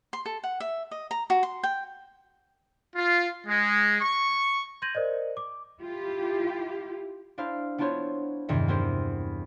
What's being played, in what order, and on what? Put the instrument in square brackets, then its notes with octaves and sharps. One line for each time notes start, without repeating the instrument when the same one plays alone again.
[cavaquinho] C6
A4
F#5
E5
D#5
A#5
F#4
C6
G5
[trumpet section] F4
G#3
C#6
[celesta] C6 G6 G#6 A#6 D#7 F#7
A#4 C5 D5 D#5
D6
[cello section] E4 F4 G4
[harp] D4 E4 C5 F5
B3 D4 E4 F4 C5 C#5
E2 G2 C3 D#3 E4
B3 C4 E4 G4 A#4 C5